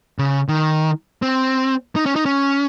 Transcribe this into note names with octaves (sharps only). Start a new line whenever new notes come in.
C#3
D#3
C4
D#4
C#4
D#4
C#4